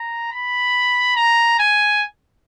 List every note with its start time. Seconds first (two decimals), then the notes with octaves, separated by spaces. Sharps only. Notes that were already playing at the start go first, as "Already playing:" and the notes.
Already playing: A#5
0.32 B5
1.16 A#5
1.59 G#5